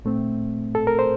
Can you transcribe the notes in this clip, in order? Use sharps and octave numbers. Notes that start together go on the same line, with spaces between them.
A#2 A3 C4
A4
A#4
C5